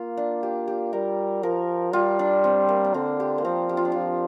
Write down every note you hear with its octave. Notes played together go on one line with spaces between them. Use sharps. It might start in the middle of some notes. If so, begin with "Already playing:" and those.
Already playing: A#3 F4
D4
G4
G4
G3 A#4
F3 A#4
G3 F4
D4
C4
A#3
D4
D3 C4
G4
A#3
F3 C4
G4
F4
D4
F3 F4